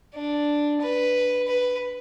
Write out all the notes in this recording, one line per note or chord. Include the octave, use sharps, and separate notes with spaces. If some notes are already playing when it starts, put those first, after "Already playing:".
D4
B4
B4